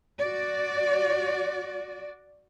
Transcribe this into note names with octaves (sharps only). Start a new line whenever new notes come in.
F#4 D5